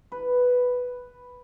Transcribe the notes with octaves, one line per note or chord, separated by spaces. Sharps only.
B4